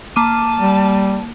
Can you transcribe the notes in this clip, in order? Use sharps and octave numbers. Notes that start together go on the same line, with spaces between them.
A#3 A5 D6 D#7
G3